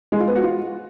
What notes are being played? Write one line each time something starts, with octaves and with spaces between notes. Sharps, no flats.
G#3
F4
B3
F#4
F4